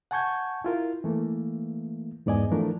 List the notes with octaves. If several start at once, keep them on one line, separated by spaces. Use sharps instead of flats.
F#5 G#5 A5 C#6 G6 G#6
E4 F4 A#4
E3 A3 A#3
E2 G#2 B3 D5 D#5 G#5
E3 F3 A3 D4 A#4